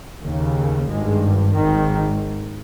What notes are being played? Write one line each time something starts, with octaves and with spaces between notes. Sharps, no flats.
D#2 C#3
G#1 G2 G#3
G#1 G#2 D#3